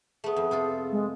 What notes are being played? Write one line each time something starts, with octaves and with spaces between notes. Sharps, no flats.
A3 B3 G#4
F2
C3 F4 A4
G#3